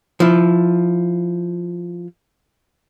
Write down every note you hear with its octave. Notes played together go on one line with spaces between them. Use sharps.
F3 E4